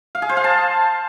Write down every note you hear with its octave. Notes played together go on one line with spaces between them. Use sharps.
F5
G#4
C5
F5
A5